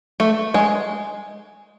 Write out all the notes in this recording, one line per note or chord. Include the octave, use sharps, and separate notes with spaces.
A3
G#3